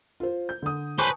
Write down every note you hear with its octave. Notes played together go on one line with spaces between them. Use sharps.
F4 C5
G6
D3 D#6
B4 C5 G#5 A5 C#6